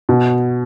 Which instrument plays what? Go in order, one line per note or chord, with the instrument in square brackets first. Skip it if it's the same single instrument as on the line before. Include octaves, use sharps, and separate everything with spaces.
[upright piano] B2